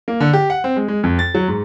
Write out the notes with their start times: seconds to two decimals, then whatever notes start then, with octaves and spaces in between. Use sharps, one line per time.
0.08 A#3
0.20 D3
0.33 G4
0.50 F#5
0.64 C4
0.76 G#3
0.88 G#3
1.03 F2
1.19 A6
1.35 F#3
1.48 G#2